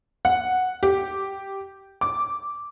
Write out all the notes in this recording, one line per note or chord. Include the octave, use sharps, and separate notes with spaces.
F#5
G4
D6